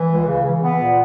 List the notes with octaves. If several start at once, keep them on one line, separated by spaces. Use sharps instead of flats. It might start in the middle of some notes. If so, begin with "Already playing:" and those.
Already playing: E3
C#2
C#3
E3
B3
A#2